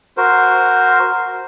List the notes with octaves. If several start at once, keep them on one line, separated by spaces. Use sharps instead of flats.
F#4 A#4 C5